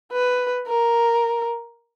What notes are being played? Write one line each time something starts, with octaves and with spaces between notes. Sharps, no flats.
B4
A#4